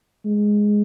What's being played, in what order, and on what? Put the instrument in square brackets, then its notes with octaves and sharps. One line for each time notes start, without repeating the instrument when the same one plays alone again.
[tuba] G#3